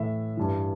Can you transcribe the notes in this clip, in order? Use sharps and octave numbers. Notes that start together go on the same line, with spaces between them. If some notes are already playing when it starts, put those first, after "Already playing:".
Already playing: A2 E3 E5
G2 E3